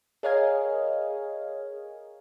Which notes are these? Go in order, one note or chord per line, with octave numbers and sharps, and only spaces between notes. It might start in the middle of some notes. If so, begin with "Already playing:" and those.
G#4 A#4 C#5 D#5 F5 G#5